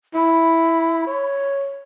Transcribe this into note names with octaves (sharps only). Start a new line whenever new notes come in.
E4 B5
C#5